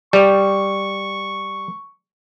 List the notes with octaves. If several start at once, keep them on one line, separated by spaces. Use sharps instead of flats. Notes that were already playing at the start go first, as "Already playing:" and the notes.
G3 C#6